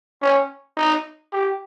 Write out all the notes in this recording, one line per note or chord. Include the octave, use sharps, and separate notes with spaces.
C#4
D#4
G4